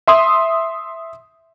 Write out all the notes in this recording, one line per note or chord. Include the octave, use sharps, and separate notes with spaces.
E5 C6 D#6